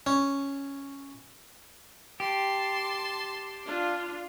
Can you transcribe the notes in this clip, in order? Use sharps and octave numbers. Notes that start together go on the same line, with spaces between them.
C#4
G4 A5 C6
D4 F4